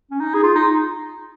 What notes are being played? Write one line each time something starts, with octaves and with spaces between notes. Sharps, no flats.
C#4
D#4
G#4
F4
D#4